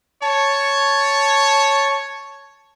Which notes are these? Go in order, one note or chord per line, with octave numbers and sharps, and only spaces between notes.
C#5 A5